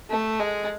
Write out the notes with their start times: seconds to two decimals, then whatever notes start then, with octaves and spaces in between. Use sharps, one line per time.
0.10 A3
0.39 G#3